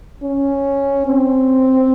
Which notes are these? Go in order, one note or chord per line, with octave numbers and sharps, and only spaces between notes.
C#4
C4